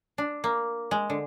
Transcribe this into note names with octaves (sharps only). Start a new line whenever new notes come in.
D4
A#3
G#3
D3